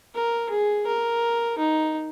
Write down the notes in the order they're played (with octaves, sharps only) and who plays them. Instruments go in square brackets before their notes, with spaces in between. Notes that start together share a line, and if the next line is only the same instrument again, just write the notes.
[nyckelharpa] A#4
G#4
A#4
D#4